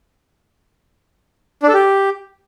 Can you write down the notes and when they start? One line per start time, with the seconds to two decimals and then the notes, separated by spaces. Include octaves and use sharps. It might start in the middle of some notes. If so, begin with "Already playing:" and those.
1.63 D4
1.68 A4
1.74 G4